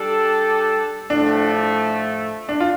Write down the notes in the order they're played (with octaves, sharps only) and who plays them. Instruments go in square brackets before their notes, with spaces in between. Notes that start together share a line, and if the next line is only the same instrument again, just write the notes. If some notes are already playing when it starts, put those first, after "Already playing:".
Already playing: [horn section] G3 D4 A4
[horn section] A2 F3 A3 [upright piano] D4
[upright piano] D4
F4